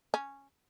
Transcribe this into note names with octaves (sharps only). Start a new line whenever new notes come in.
C#4